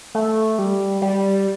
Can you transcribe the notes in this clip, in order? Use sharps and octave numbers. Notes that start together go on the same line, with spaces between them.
A3
G3
G3